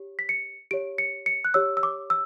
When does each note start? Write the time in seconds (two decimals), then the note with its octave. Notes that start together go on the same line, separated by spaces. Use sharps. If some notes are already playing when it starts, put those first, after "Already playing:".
Already playing: G4 C#5
0.19 B6
0.29 C#7
0.71 G4 C#5 D7
0.98 C#7
1.26 C#7
1.45 F#6
1.54 G4 C#5 E6
1.77 E6
1.83 D6
2.10 E6